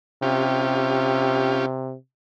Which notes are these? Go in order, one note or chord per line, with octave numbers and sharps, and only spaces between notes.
C3 C#4 F4 G4